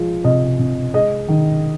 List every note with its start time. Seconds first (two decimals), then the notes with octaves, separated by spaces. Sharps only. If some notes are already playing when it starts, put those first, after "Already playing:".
Already playing: F3 G#3
0.24 C3 D#5
0.59 C3
0.94 G#3 D#5
1.28 D#3